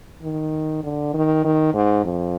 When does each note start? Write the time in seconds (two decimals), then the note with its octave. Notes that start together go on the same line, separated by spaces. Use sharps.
0.22 D#3
0.83 D3
1.14 D#3
1.44 D#3
1.74 G#2
2.04 F2